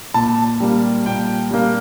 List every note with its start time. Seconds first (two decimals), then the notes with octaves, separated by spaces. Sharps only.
0.14 A#2 A5
0.60 G3 A#3
1.06 A#2 G5
1.51 G3 A#3